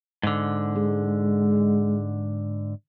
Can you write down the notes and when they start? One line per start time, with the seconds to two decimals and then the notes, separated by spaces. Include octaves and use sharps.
0.23 G#2 D3
0.76 G#3